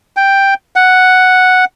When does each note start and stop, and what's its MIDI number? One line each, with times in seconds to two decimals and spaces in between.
0.17 0.54 79
0.76 1.65 78